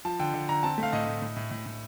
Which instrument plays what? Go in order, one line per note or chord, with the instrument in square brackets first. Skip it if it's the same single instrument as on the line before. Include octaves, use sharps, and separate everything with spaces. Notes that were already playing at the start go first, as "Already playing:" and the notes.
[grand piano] F3 A5
D3 G5
D3
D3 A#5
C4 A5
A3 F5
A2 D#5
A2
A2
A2
A2
A2